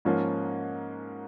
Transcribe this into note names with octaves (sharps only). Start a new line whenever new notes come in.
G#2 F3 A#3 C#4 F4